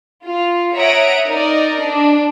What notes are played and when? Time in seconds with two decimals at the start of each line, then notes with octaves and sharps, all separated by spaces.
0.25 F4
0.76 C#5 E5 F#5 A#5 D#6 D7
1.27 D#4 A#4 D5 D#5
1.83 D4